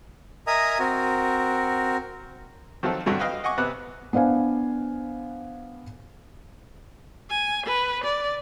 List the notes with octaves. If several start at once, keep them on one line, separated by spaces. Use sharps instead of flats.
A#4 D#5 E5 G#5 A#5 D#6
C4 F#4 A#4
D#3 F3 F#3 C4 F4 A4
G2 D3 F#3 A3
B4 D#5 F5 G5
D#5 F#5 G#5 C#6 D6
C3 B3 B4 D6 F#6
B3 D4 C5 F5 G#5
G#5
B4
D5